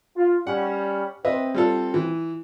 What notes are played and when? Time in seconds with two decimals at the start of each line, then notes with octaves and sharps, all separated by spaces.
0.16 F4
0.47 G3 C#4 F#5
1.25 C4 B4 D#5 E5
1.55 G3 F4 A4
1.94 E3